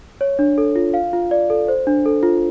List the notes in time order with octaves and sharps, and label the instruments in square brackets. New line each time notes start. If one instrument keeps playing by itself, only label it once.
[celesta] C#5
D4
A4
F4
F5
F4
D5
A4
C5
D4
A4
F4